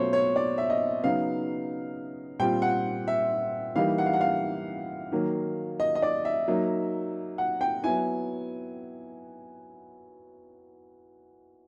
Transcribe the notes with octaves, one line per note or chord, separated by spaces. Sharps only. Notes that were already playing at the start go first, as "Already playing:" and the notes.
Already playing: B2 F#3 A3 C#4 F4 C5 C#5
C#5
D5
E5
D#5
C#3 F#3 B3 D#4 F5
A#2 G3 C4 F4 G5
F#5
E5
E3 G3 A#3 D#4 F5
F#5
F5
F#5
F5
D#3 F#3 A#3
D#5
D#5
D5
E5
F#3 A#3 D#4
F#5
G5
F#3 B3 E4 G#5